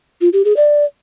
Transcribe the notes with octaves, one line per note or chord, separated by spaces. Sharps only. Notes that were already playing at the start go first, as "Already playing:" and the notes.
F4
G4
G#4
D5